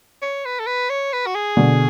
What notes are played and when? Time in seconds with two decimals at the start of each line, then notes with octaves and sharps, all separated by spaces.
0.22 C#5
0.45 B4
0.59 A4
0.67 B4
0.90 C#5
1.13 B4
1.26 F#4
1.35 G#4
1.57 B2 D3